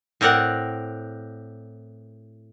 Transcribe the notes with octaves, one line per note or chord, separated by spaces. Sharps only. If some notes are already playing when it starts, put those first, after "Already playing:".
A2 C4 A#4 D5 F#5